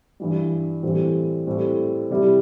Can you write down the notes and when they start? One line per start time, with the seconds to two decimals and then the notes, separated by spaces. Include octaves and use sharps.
0.20 G2 E3 G3
0.83 A2 E3 G3 C4
1.47 A2 G3 C4 A4
2.10 C3 G3 E4